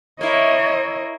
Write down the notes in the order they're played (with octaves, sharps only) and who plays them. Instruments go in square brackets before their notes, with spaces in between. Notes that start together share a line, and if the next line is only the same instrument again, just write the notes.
[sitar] A#3 E4 [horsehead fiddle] C#5 D#5